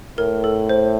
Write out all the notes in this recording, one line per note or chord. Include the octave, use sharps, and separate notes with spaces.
A2 A#4
A4
C5